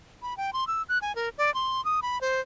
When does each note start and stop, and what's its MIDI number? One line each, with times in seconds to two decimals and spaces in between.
0.22 0.36 83
0.37 0.53 79
0.53 0.67 84
0.67 0.83 88
0.89 0.98 90
1.02 1.15 80
1.15 1.29 70
1.38 1.53 74
1.54 1.83 84
1.85 2.00 87
2.02 2.21 83
2.21 2.40 72